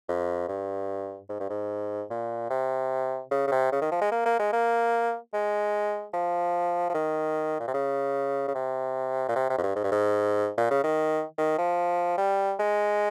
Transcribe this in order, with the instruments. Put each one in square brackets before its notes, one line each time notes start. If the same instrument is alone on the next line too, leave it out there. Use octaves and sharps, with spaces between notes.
[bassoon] F2
G2
G#2
G2
G#2
A#2
C3
C#3
C#3
C3
C#3
D#3
F3
G#3
A#3
A#3
G#3
A#3
G#3
F3
F3
D#3
A#2
C3
C#3
C#3
C3
A#2
C3
C3
F2
G2
G#2
G2
G#2
A#2
C#3
D#3
D#3
F3
G3
G#3